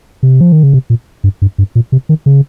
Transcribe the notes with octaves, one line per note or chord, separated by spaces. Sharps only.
C3
F3
D#3
C#3
C3
A#2
G2
G2
G2
A#2
C3
D#3
C#3